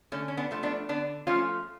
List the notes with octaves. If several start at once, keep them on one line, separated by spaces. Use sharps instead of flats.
D3 A3 C#4
C#4
B3 D4
F3 A3
B3 D4
D3 B3 D4
F3 A3 C#4 F4